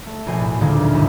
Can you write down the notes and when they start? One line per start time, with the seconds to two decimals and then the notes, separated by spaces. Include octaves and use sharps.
0.07 A3
0.27 A#1 B2 C5 G#5
0.40 A2
0.61 D2 A#2 D3 D#3 G#3 A#3
0.77 F#1
0.93 G#2 C3 F#3 G3 D#4 E4